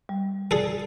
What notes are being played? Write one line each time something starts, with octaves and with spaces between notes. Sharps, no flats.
G3
G#4 A4 D5